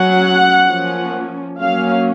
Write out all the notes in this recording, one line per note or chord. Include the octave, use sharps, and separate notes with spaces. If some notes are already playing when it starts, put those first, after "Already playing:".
Already playing: F#3 C#4 F#5
F3 A#3 C#4
F#3 A#3 C#4 F5